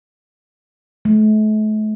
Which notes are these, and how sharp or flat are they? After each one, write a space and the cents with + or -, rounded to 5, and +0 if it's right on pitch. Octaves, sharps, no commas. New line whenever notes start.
A3 -40